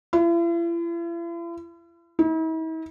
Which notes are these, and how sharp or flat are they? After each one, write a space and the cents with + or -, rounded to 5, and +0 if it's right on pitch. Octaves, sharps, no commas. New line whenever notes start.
E4 +45
E4 -45